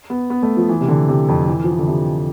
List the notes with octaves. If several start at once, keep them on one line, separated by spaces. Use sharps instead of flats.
B3
B3
A3
F3
E3
C3
D3
C3
F2
E3
F3
E3
D3
C3